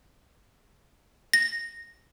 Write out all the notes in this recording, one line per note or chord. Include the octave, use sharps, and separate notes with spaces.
A#6